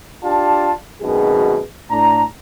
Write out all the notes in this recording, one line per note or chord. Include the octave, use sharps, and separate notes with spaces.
D4 F4 G4 D5 A5
G#1 F#2 B2 D#3 G#4
A2 D4 A#5